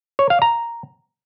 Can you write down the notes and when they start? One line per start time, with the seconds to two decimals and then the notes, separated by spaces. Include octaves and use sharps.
0.19 C#5
0.30 F5
0.42 A#5